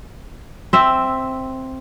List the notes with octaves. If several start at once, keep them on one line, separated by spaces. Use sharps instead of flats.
C4 E5